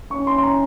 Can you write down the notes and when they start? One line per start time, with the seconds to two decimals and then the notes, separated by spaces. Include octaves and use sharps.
0.11 C#4 C#6
0.27 C6
0.38 C6
0.43 A#5